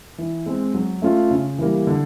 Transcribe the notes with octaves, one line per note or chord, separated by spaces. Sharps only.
E3
G#3 C4
F#3
A3 C#4 F4
C#3
E3 G3 A#3
D3